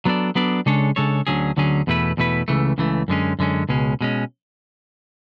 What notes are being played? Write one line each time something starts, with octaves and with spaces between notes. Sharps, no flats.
F#3 B3 D4 A4 D5
F#3 B3 D4 A4 D5
C#3 G#3 D4 A4 C#5
C#3 G#3 D4 A4 C#5
D2 D3 F#3 C#4 G#4
D2 D3 F#3 C#4 G#4
E2 B2 A3 E4 B4
E2 B2 A3 E4 B4
C#2 C#3 E3 A3
C#2 C#3 E3 A3
F#2 D3 G#3 C#4
F#2 D3 G#3 C#4
C#2 B2 G#3 C#4
B2 G#3 C#4